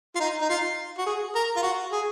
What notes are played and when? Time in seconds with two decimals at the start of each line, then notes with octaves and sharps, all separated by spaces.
0.16 F4
0.20 D#4
0.41 D#4
0.50 F4
0.98 F#4
1.06 G#4
1.35 A#4
1.56 F4
1.63 F#4
1.92 G#4